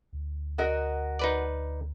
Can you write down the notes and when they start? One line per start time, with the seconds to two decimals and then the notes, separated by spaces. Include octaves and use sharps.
0.13 D2
0.58 F#4 A#4 D#5
1.19 D#4 B4 D5